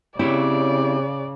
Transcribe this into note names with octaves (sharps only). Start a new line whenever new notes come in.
C#3 C4 E4 G4 C#5 D5